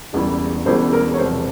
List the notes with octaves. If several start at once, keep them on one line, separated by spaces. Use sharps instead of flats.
E1 E2 C#3 E3 G3
E1 E2 C#3 E3 G3 C5
A#4
C#5
E1 E2 C3 F3 C5